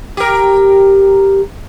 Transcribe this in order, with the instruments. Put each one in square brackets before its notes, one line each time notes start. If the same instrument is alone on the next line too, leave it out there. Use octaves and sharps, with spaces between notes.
[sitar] G4 A#4